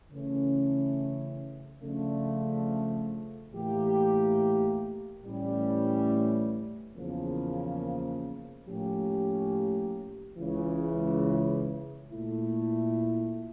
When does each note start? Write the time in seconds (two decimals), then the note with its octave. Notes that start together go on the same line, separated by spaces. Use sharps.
0.11 C#3 E3 A3 C#4
1.82 C#3 F3 A3 D4
3.53 A2 E3 A#3 E4 G4
5.24 A2 E3 G3 C#4
6.96 E2 C#3 F3 A#3
8.67 A2 F3 A#3 C#4 G4
10.38 C#2 C#3 E3
12.10 A#2 A3 E4